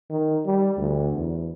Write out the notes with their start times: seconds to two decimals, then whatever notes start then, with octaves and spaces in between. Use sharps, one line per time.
0.10 D#3
0.46 G3
0.77 D2
1.14 E2